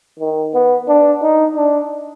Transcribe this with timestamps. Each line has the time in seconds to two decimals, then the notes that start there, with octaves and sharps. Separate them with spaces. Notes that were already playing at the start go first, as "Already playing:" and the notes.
0.19 D#3
0.54 B3
0.88 D4
1.22 D#4
1.56 D4